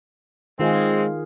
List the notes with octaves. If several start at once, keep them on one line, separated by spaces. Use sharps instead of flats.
D#3 G#3 C4 F4 G#4